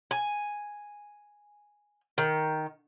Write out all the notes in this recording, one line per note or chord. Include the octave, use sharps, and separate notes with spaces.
G#5
D#3